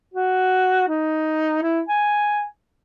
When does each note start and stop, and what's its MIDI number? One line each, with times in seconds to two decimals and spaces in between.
0.14 0.87 66
0.88 1.62 63
1.62 1.81 64
1.89 2.45 80